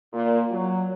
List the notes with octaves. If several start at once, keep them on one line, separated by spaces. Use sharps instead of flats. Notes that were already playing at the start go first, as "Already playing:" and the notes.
A#2
F#3